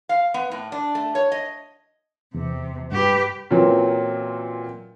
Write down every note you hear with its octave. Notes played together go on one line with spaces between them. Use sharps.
F5
B3
A2
D4
A3
C#5
D#5
E2 C3
G2 G4 B4
A#2 E3 F#3 A#3 C4 C#4